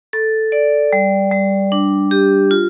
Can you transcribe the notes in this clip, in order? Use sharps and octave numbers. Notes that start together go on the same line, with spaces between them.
A4
D5
G3
G3
D4
G4
F4